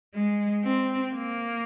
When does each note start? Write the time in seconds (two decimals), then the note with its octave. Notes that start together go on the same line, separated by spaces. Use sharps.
0.15 G#3
0.64 C4
1.14 A#3